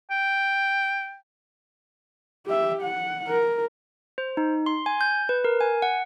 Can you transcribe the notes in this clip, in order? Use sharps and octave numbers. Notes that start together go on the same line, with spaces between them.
G5
G4 E5
F#5
A#4
C5
D#4
C6
G#5
G6
B4
A#4
G#5
F#5